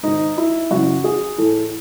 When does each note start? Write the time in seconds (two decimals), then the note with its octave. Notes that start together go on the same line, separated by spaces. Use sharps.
0.03 G#2 D#3 D#4
0.38 E4
0.71 F#2 C#3 E3 F#4
1.04 G#4
1.38 A2 E3 A4